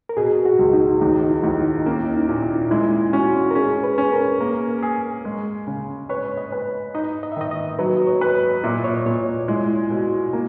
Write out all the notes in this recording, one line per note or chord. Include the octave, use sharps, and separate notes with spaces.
A#4
B2 G#4
F#4
C#2
D#4
D#2 D#4
E4
D#2
D#4
A#3 C#4
E4
D#4
A#2
E4
G#3 E4
C#4 F#4
A#4
C#4 G#4
B4
C#4
A#4
A#3
G#4
G#3
C#3
B4 C#5
D#5
B4
D#4 D#5
D#5
E5
D#3 D#5
D#5
F#3 B4
D#5
C#5
B4
D#5
A#2 E5
D#5
C#5
D#5
A#2 C#5
G#3 E4
B2
A#3